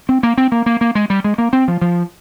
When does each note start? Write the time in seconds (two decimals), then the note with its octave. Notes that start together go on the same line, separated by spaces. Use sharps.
0.09 C4
0.23 A#3
0.38 C4
0.52 A#3
0.66 A#3
0.81 A#3
0.95 G#3
1.10 G3
1.24 G#3
1.38 A#3
1.53 C4
1.68 F3
1.82 F3